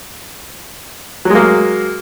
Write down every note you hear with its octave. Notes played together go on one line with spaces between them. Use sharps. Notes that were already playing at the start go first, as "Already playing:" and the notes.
F#3 G#3 A#3